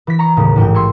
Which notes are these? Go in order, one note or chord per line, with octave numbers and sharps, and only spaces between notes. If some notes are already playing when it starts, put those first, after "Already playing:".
E3 B6
A#5 C#6
D#2 A2 C#3 G#3
A1 G#2 G5
C6 C#6 E6 G#6